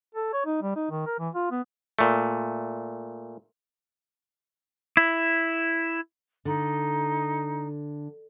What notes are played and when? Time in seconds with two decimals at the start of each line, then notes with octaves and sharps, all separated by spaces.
0.15 A4
0.33 C#5
0.46 D#4
0.62 G3
0.76 D#4
0.91 D#3
1.06 A#4
1.19 E3
1.35 F4
1.51 B3
1.99 A#2 A3
4.97 E4
6.45 D3 D#4